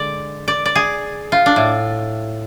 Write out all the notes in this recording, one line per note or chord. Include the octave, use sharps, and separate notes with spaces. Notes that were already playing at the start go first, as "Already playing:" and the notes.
Already playing: D3 G#3 D5
D5
D5
G#4
F4
D4
A2